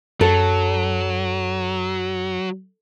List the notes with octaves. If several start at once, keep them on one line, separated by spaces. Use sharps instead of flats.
F#2 F#3 A4